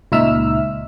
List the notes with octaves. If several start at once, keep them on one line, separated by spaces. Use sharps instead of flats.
C#2 A#2 D#4 E5 E6 F6